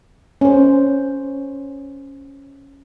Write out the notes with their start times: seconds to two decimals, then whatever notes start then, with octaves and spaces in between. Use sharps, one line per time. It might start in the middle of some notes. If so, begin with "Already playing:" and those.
0.41 C#4 C5